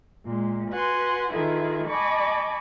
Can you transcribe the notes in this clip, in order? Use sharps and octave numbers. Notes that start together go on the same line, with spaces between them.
A#2 G#3
F#4 B4 F#5 G#5 C6
D#3 E4 F4 G#4 A4 B4
D#5 G#5 A5 B5 C#6 D6